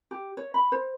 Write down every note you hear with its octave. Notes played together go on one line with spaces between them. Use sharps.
G4
C#5
B5
C5